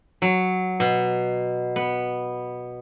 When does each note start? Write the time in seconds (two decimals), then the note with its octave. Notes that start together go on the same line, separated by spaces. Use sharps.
0.22 F#3
0.80 B2
1.76 B3